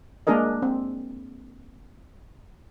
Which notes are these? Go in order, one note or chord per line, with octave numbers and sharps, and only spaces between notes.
G#3 A#3 D4 G#4 A#4 D#5
C4